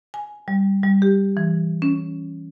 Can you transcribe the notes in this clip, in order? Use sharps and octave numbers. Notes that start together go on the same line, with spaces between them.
G#5
G3
G3
G4
E3
C#4